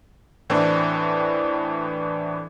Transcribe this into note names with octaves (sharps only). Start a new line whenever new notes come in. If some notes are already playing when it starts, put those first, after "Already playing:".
A2 E3 C4 D4